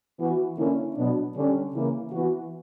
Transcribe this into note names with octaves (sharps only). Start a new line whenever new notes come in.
E3 B3 F#4
D3 A#3 C#4 E4
B2 F#3 B3 D4
D3 G3 C#4 G4
C#3 E3 A#3 E4
E3 B3 F#4